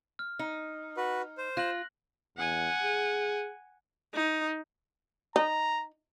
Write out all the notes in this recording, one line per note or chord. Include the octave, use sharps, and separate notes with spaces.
F6
D#4
F#4 B4
C5
F4 F#6 A#6 F#7
E2 F#5 G#5
G#4
D#4
D#4 A#5